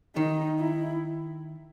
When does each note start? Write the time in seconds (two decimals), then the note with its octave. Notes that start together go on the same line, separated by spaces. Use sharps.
0.16 D#3 D#4
0.59 E4